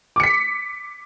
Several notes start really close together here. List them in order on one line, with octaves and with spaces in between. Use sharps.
D6 C#7 B6